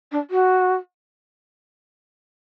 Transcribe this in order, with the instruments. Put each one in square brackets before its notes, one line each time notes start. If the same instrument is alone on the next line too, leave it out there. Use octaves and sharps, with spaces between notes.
[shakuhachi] D4
F#4